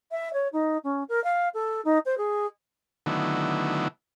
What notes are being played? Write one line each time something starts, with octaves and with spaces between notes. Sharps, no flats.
E5
C#5
D#4
C#4
A#4
F5
A4
D#4
C5
G#4
D3 D#3 F#3 A3 B3 E4